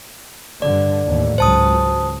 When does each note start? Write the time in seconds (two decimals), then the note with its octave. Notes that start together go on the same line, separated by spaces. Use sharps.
0.62 G2 D3 D5
1.05 D#2 A2
1.38 G#1 C#2 F#3 C5 A5 D#6